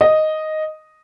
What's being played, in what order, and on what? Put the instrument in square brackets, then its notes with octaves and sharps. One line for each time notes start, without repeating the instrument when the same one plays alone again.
[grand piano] D#5